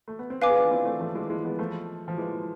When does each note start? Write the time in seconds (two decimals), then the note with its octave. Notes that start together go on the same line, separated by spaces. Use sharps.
0.08 A3
0.19 B3
0.30 C4
0.41 B3 D4 B4 F5 G#5 D6
0.50 G#4
0.56 D4 F4
0.71 C4 E4
0.85 A3 C4
1.00 F3 A3
1.15 E3 G#3
1.30 E3 G#3
1.44 G#3 B3
1.59 F3 A3
2.08 F3
2.18 E3 G#3